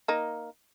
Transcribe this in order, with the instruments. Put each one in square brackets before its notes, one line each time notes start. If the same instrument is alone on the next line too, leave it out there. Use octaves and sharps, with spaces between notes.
[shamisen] A#3 D#4